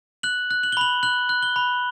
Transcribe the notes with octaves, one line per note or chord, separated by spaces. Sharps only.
F#6 F#7
F#6
F#7
G7
B5 F#7
F#6 F#7
F#6
G7
B5